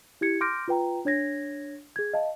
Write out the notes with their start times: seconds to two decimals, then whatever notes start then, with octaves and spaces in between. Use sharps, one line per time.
0.21 E4 G4 G#6 C#7
0.41 C6 D6 F6 G6 A#6 D7
0.68 F4 B4 G5 A#5
1.05 D4 C#5 G#6 A#6
1.96 G#4 G#6
2.14 D#5 F5 A5